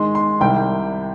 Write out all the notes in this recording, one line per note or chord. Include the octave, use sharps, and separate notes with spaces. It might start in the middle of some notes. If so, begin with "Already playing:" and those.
Already playing: G#2 D#3 G#3 C6
C6
C2 C3 D#3 G3 G5